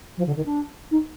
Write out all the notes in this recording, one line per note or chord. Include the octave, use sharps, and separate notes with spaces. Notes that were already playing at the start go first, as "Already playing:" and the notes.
F3
D3
D#3
D4
D#4